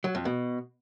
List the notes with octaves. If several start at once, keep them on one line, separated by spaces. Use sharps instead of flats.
F#3
F2
B2